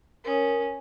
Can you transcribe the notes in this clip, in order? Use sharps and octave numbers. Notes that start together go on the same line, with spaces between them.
C#4 A#4 D#6